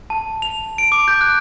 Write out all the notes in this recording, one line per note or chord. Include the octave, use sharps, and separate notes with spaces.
A5
F7
D7
D6
G6
F#6